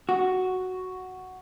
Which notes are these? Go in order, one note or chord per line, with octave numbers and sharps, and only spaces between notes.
F#4